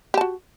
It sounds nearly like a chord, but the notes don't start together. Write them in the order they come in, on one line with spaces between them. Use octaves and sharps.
G4 A5 F#4